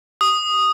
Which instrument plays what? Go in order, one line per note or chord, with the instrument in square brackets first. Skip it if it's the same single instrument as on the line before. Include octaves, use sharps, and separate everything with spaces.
[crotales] D#6